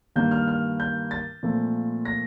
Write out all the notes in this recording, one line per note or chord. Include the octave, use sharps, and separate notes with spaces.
G2 D#3 A#3 G6
F6
F6
G6
A6
A#2 F3 A3 C4
A#6